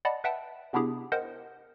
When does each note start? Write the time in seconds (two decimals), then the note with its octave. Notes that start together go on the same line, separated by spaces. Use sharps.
0.05 D5 D#5 F#5 A5 B5
0.24 B4 E5 F#5 G5 A5
0.73 C3 B3 D4 E4 G4 G#4
1.12 A#4 C5 D#5 F#5 G5